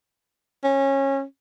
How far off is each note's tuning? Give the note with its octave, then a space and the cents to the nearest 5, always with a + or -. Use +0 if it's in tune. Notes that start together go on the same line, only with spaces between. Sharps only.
C#4 -20